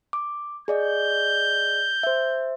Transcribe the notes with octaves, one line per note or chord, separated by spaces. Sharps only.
D6
G#4 D5 D#5 G6
C5 E5